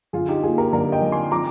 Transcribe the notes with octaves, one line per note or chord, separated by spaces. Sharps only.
D3 F4 G#4
D#4 G4
A#3 F4 G#4
G4 A#4
D3 A#4 D5
D#5 G5
D3
G#5 C6
F3 A#5 D6